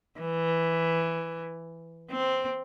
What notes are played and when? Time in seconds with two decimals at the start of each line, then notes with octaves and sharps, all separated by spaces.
0.20 E3
2.11 C4